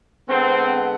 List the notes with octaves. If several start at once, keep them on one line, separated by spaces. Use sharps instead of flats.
D3 G#3 B3 C4